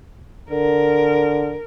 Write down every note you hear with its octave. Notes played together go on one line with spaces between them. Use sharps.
D3 A#4